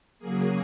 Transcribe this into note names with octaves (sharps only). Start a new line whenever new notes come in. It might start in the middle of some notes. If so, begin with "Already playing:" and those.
C#3 F#3 A#3 G#4